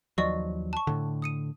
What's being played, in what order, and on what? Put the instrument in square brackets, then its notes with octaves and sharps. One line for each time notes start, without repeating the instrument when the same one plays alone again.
[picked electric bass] D#2 F3 F#3 [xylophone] D5 D#5 C#6
[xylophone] A5 C#6
[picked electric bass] A2 D3
[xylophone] D#6 C#7 D#7